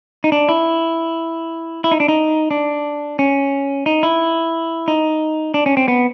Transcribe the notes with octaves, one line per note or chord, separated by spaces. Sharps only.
D#4
D4
E4
E4
D#4
D4
D#4
D4
C#4
D#4
E4
D#4
D4
C#4
C4
B3